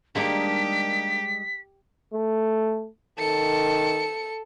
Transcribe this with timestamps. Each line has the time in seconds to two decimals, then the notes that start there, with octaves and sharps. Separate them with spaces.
0.15 D#3 G3 G#3 A#3 D4 D#4 G4 B6
2.13 A3
3.19 D#3 A4 C#7